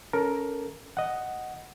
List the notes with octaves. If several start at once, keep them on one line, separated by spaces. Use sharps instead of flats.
C#4 A4 A#4
D#5 F#5